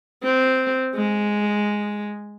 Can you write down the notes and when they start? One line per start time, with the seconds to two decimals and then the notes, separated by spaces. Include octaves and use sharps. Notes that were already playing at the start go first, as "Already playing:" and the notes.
0.23 C4
0.95 G#3